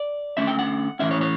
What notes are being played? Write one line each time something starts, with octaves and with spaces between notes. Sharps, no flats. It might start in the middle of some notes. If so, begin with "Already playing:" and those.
Already playing: D5
D3 A3 C#4 E5
G5
F#5
A2 E3 A3 C#4 E5
C#5
C#5